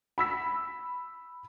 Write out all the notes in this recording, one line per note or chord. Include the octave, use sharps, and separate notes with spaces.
B5 E6 B6